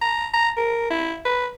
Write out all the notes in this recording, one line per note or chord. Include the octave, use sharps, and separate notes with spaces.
A#5
A#5
A#4
E4
B4